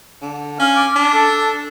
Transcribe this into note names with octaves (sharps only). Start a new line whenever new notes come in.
D3
C#4 F5
D6
D4
A4